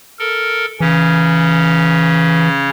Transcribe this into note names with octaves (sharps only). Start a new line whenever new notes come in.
A4 A#4
C#3 E3 C#4